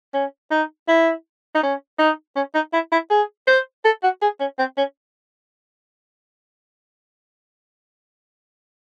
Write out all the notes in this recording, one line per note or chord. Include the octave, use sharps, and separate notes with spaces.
C#4
D#4
E4
D#4
C#4
D#4
C#4
D#4
E4
E4
G#4
C5
A4
F#4
G#4
C#4
C4
C#4